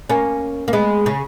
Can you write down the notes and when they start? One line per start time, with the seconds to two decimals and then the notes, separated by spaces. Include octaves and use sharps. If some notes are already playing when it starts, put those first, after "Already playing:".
0.09 A#3 C#4
0.68 A#3
0.73 G#3 B3
1.06 C#3